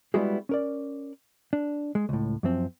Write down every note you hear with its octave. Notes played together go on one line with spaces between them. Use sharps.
G3 G#3 B3 E4 F#4 G#4
C#4 A#4 D5
D4
G#3
C#2 A2
F#2 F3 C4